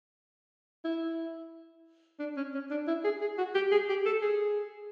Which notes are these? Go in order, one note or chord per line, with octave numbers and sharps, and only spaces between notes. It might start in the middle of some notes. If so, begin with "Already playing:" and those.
E4
D4
C#4
C#4
D4
E4
G#4
G#4
F#4
G4
G#4
G4
A4
G#4